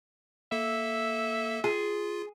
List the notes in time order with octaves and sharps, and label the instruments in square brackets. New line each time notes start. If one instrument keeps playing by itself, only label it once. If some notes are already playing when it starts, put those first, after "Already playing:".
[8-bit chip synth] A#3 A4 [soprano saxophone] E5
[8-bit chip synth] F4 [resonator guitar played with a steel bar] G#4